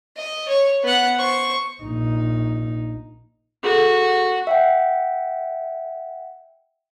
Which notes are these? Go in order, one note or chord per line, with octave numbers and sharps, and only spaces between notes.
D#5
C#5
B3 F#5
C5 C#6
A#1 D#4
F#4 G#4 A4
E5 F#5 G5